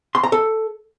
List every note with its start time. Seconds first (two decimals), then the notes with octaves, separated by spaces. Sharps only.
0.15 C6
0.23 A#5
0.32 A4